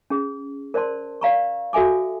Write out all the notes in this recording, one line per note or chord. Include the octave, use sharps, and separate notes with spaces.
C#4 G#4
A#4 C5 D5 A5 C6
D5 F5 A#5 C#6
F#4 A4 E5 G#5 D6